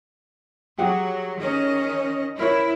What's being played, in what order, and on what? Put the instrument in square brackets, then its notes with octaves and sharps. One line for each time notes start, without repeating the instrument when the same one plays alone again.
[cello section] F#3 [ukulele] G4 G#4 F#5
[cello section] D#3 C#4 D#5
[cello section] E4 [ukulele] A#4 C5 C#5